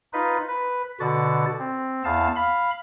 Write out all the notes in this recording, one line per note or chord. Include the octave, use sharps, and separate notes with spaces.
D#4 F4 B4
B4
B2 D3 F#4 A6
C4
E2 B3 F5 A5
F5 B5